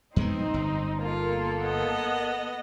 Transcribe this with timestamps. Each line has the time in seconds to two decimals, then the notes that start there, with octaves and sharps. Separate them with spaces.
0.16 F2 G#3 B3 C4 D#4
0.54 G1
1.02 A#3 F4 A4
1.61 B3 D#5